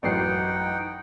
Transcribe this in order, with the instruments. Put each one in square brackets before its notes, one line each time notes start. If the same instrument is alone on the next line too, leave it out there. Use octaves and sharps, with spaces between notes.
[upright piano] A1 F#2 C7 [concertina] D#4 F#5 G5